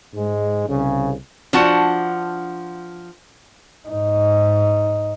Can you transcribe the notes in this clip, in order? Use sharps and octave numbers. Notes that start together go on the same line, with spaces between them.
G#2 G#3
C2 C#3
F3 D4 F#4 F#5 A5
G#2 D#4